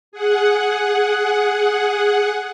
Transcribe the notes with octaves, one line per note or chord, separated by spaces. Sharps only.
G#4 F#5